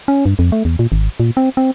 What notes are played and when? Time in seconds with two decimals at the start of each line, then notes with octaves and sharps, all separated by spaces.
0.08 C#4
0.26 G2
0.39 F2
0.52 A3
0.65 E2
0.79 A#2
0.92 G#1
1.20 A#2
1.37 C4
1.57 C4